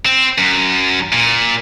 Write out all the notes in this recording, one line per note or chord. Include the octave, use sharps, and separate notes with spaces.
C4
F#2
A#2